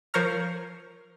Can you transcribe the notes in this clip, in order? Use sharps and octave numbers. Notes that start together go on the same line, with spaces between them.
F3 A#4 C5 C#5 A#5 F6